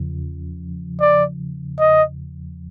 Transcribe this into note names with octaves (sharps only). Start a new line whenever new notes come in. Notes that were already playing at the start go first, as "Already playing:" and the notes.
Already playing: E2 C#3 F3
D5
D#5